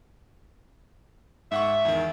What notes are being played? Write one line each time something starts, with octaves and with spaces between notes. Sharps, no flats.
G#2 E5 F#5 C#6
E2 D#3